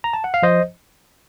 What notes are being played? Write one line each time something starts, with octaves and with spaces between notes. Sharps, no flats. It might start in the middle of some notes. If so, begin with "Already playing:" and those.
A#5
A5
F#5
F5
F3 C5 D#5